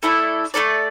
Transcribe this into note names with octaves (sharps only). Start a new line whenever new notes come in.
A3 E4 A4 D5
A3 E4 A4 D5